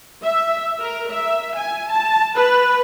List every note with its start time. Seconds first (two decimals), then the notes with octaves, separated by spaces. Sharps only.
0.23 E5
0.81 A#4
1.11 E5
1.57 G#5
1.91 A5
2.35 B4